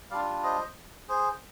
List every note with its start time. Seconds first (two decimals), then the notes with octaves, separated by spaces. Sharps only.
0.11 G3 D4 F4 D5 F5
0.43 C5 D#5
1.08 G#4 C5